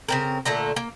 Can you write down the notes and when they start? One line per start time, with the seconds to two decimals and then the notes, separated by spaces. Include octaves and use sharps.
0.08 C#3 C4 A#4
0.45 A#2 D3 A3 A#5
0.76 A#3